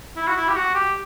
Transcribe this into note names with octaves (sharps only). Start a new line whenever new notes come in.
E4
F#4
E4
G4
F#4
G4